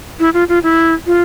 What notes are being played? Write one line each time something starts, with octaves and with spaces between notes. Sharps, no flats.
E4
F4
F4
E4
F4